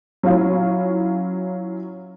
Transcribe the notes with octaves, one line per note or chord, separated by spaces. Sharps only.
F#3 C#4 E4 F4